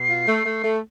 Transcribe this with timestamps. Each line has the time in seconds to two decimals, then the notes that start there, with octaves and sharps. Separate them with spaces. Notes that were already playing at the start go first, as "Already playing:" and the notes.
Already playing: B2 C7
0.09 F4
0.28 A3
0.46 A3
0.64 A3